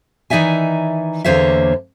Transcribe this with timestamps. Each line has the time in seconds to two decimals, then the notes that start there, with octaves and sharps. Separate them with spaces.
0.30 D#3 E3 D#4 D5 E5 G#5
1.24 E2 D3 A#3 C5 C#5 E5